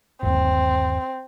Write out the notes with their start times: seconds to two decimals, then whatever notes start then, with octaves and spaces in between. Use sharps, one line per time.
0.23 G1 D#2 C4